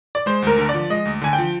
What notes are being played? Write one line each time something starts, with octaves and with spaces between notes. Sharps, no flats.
D5
G#3 C5
D2 A#4
D3
F3 D5
G#3 D#5
D2
D3 G#5
G5
F3